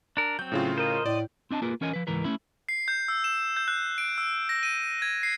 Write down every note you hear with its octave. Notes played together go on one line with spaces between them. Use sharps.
D4 A#4
F#3 C4 G6
A2 C#3 F4
A#4 C5 D#5
A2 D5
C4 D4 D#5 G#5 A5
A#3 F4 G#4 A#4 B4
E3 C#4 A#4 C#5 D#5 G#5
F3 B4
C#2 G#2 E3 A#4 B4
A3 C4 C#4 E4
C7
G6
E6
E7
G6
F#6
D7
E6
A#6
D#7
G#6
C7